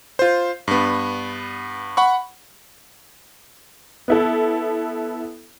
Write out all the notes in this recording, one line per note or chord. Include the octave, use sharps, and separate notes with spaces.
F4 C5
G2 B3
F#5 B5 C#6
B3 E4 A4